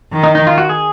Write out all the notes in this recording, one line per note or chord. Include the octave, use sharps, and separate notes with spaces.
D#3
D#4
D#4
F4
F#4
G#4